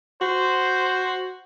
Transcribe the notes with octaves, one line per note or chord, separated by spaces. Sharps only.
F#4 C5